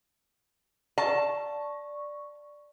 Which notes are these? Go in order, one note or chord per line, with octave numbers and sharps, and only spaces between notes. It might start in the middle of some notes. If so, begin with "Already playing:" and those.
D5 A5 C#6